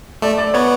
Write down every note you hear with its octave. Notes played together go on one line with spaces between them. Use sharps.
A3 D5
D5
B3 C#5